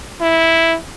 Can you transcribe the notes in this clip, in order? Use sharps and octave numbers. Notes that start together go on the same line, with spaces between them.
E4